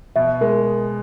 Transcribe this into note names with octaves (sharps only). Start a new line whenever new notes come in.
B2 E5
G#3 A#4